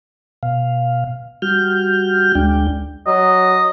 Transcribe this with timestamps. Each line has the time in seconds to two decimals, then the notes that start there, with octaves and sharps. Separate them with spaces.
0.43 B2 F5
1.42 G3 F#4 F6 G6
2.35 D2 G#3 D4 G5
3.07 F#3 D#5